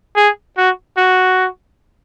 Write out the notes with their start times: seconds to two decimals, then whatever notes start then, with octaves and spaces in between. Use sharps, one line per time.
0.16 G#4
0.58 F#4
0.98 F#4